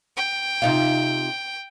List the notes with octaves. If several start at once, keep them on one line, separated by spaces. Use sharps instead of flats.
G5
C3 D#4 F4